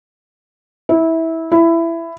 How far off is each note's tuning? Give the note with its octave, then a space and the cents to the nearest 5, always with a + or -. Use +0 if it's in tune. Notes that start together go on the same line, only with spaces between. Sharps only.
E4 -20
E4 +15